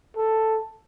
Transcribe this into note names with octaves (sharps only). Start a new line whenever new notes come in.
A4